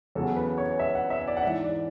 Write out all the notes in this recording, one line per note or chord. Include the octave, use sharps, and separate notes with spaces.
E2 C#3 F#3 A4
B4
C#5
E5
F#5
E5
D5
F#5
G#2 E3 E5
D5